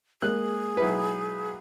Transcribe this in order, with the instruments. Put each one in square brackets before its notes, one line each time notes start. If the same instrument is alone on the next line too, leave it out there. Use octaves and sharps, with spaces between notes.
[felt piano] G#3 A#3 [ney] G#4 [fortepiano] F#6
[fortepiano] B1 E4 B4